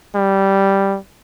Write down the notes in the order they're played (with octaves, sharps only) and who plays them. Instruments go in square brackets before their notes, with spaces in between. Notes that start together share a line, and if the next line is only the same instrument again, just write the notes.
[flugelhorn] G3